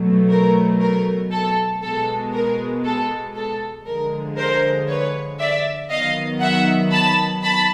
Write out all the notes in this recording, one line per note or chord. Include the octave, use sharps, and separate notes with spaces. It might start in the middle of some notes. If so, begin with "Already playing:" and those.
Already playing: B2 F#3 A3
A#4
A#4
A4
B2 G#3 B3 A4
A#4
A4
A4
D3 F3 G#3 A#4
A#4 C5
B4 C#5
D5 E5
D#3 F#3 B3 D#5 F5
E5 F#5
A5 B5
A5 B5